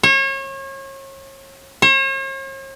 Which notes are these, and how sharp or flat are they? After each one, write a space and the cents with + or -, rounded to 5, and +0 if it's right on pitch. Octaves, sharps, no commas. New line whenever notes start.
C#5 -35
C#5 -45